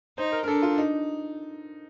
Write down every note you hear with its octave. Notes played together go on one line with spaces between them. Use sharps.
D#4 C5
A#4
A#4
D4 A4
F4
D#4